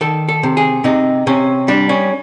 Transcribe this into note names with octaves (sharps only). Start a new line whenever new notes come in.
D#3 A4
A4
C3
G#4
C3 D#4
C3 C#4
G3 D4
C#4